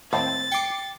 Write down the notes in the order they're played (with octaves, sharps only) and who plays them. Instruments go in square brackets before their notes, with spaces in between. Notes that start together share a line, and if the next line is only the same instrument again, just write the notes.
[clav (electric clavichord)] D#2 A2 [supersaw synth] C4 [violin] A6
[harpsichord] G5 [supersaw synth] D6 C7 C#7